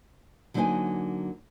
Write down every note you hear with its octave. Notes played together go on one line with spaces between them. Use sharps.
D3 F#3 A#3 D#4 C5 G#5